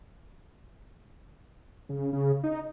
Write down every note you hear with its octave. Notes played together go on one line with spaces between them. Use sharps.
C#3
C#3
D#4